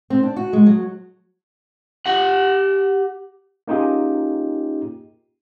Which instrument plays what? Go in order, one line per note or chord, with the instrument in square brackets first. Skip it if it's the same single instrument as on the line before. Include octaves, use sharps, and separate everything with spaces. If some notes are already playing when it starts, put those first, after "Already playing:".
[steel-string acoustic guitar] C4
D4
F#4
G#3
F#3
[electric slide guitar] G4 F#5
[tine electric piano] A#3 C#4 D#4 F4 G4 G#4